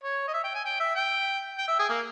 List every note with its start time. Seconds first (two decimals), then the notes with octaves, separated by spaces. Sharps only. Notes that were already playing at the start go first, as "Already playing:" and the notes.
0.03 C#5
0.28 D#5
0.34 E5
0.44 G5
0.55 G#5
0.64 G5
0.80 E5
0.95 G5
1.58 G5
1.68 E5
1.79 G#4
1.89 A#3